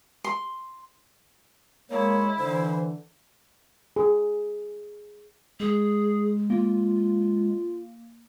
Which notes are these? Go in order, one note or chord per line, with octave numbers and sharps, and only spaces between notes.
C6
G#3 A#3 E4 C#5
D3 E3 C5
G#4
G#3 G#4
A#3 F4